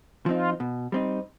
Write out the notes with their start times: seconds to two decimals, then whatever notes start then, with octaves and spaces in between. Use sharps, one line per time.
0.26 F3 C4 D#4 F4
0.60 B2
0.92 G3 C4 D#4